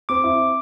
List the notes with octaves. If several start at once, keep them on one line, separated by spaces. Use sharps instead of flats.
C4 D6
E4